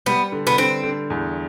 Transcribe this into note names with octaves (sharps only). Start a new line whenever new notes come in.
G3 B3
D3
B3
D3 C4
D3
E2